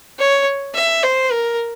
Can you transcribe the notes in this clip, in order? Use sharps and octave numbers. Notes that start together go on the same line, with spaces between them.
C#5
E5
C5
A#4